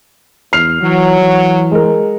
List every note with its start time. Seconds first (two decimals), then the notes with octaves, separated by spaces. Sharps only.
0.53 E2 F6 C7 F7
0.82 E3 F#3
1.21 E3
1.71 G#3 A#4